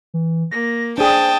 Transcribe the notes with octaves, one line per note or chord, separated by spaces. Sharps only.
E3
A#3 A#6
D4 G#4 C5 G5 A5 D#6